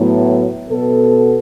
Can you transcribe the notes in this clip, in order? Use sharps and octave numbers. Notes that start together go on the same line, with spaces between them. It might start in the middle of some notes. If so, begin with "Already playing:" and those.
Already playing: A2 F#3 B3
B2 B3 A4